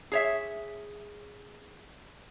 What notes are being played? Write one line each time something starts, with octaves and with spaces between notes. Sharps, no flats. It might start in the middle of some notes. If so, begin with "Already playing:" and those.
G#4 C#5 E5